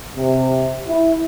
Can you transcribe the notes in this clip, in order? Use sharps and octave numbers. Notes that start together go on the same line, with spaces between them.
C3
E4